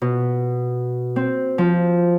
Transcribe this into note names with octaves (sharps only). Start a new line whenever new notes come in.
B2
C4
F3